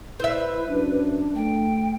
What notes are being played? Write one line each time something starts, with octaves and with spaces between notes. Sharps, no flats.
E4 B4 C5 E5
F#2 D4
A3 G5